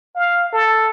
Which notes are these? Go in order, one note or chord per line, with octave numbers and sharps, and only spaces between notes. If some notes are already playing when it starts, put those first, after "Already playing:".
F5
A4